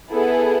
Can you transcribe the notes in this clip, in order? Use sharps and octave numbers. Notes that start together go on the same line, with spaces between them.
B3 E4 G#4 A4